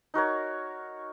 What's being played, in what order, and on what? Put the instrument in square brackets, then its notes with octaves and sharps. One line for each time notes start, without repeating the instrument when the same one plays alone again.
[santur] D#4 F#4 A#4 C#5